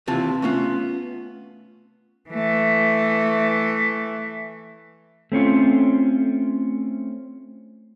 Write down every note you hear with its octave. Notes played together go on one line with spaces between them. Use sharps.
D#2 C3 E3 F4 A5
A3 B3 C#4 F4
E3 A3
A3 C4 C#4 F4